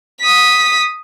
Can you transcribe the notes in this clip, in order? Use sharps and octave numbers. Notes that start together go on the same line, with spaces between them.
D#6 B6